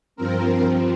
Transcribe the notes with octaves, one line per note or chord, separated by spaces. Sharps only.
G2 F3 C4 A#4